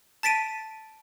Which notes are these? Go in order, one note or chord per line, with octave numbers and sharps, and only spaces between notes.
A5 A6 B6 D7 D#7